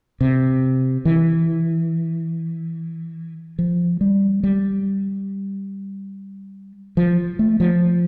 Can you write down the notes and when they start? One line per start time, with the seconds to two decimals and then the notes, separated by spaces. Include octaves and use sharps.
0.21 C3
1.05 E3
3.59 F3
4.01 G3
4.43 G3
6.97 F3
7.39 A3
7.60 F3